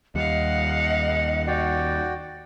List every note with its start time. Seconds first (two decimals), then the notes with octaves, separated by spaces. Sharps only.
0.15 D#2 G3 D#5 F5 F#5
1.47 F#4 D5 G5